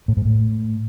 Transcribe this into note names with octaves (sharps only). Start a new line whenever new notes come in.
A2
G#2
A2